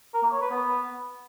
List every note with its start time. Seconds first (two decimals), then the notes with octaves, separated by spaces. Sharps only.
0.14 A#4
0.23 A#3
0.32 C#5
0.41 B4
0.51 B3